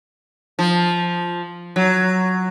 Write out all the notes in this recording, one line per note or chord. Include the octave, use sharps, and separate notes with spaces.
F3
F#3